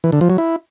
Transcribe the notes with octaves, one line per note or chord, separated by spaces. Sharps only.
E3
D3
F3
F#3
E4